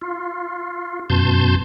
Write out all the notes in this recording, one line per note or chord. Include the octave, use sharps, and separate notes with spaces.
F4
F#2 B2 A5 C6 G6